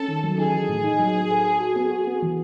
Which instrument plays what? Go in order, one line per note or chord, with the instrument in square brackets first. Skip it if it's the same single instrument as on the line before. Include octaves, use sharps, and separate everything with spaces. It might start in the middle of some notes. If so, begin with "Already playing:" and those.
Already playing: [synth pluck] C#4 [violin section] A4
[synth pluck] D#3
F#3
[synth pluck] D#4 [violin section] G#4
[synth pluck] E3
A2
D#4
F#3
B3
A4
A4
F#4
B3
F#4
B3
E3